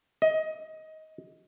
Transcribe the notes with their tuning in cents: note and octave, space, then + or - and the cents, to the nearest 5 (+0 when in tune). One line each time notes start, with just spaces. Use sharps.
D#5 +20